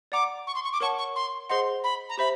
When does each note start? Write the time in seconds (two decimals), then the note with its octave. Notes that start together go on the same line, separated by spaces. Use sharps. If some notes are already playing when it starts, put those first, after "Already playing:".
0.12 D5 F#5 A#5 D6
0.47 C#6
0.55 C6
0.64 C#6
0.73 D6
0.81 A#4 C#5 F#5 A5 C#6
0.98 C#6
1.15 C6
1.49 G#4 C5 D#5 F#5 C6
1.83 B5
2.09 A#5
2.18 G4 C5 E5 B5